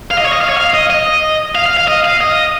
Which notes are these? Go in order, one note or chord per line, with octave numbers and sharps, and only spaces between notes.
F5
D#5
C#5
D#5
F5
C#5
F5
D#5
D#5
F5
F5
F5
D#5
F5
D#5